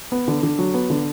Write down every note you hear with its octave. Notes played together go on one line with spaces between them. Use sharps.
B3
D3
D3
F#3
B3
D3